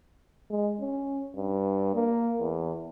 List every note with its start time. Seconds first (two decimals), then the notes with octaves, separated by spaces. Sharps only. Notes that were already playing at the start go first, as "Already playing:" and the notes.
0.50 G#3
0.81 C#4
1.36 G2
1.95 A#3
2.40 E2